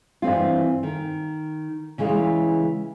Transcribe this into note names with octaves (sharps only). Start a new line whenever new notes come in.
G2 E3 C4 F4
D#3
C#3 E3 G#3 F4